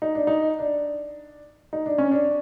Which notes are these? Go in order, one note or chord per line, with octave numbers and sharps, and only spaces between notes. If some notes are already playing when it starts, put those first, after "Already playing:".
D#4
D4
D#4
D4
D#4
D4
C#4
D4